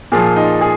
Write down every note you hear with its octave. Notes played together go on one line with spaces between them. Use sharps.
A#2 F3 G#4
D#4
G#4